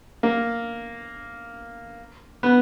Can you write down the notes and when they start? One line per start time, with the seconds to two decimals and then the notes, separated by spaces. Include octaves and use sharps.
0.23 A#3
2.43 B3